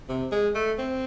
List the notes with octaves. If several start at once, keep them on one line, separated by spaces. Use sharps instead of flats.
C3
G#3
A3
C4